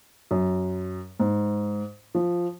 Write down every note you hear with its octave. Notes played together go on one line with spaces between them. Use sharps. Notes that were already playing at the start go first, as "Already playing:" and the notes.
F#2
G#2
F3